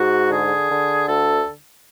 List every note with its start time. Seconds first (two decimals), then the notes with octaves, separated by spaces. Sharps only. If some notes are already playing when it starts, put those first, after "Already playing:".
Already playing: G#2 F#4
0.31 D3 G#4
0.70 D3
1.07 D2 A4